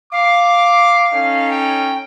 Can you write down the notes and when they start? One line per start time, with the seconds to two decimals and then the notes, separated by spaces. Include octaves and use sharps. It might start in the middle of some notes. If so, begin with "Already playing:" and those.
0.12 F5 D6
1.13 C#4 D#4 A4
1.50 G5